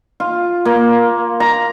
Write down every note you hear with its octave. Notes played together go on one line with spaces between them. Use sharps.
F4
A#3
A#5